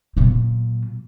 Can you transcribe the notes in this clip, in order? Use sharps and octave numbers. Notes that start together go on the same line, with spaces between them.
A#2 F#3